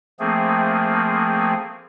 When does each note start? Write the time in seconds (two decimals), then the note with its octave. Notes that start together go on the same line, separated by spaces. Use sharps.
0.20 F3 A3 A#3 C4 G#4